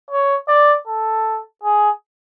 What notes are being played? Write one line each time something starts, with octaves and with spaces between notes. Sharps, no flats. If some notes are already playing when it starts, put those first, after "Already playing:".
C#5
D5
A4
G#4